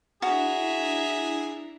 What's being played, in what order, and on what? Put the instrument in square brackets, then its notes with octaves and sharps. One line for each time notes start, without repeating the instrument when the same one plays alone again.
[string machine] D4 E4 C7 [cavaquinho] F#4 [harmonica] G#4 [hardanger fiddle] E5 A#5